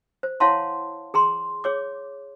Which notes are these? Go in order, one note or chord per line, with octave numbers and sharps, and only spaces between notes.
C5
E4 C#5 F5 F#5 A5 C6
G#4 A#5 C6
G#4 C#5 D6